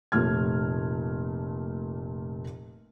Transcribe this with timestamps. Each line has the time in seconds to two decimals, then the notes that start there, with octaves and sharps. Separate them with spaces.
0.12 F1 A#2 A3 F6 G#6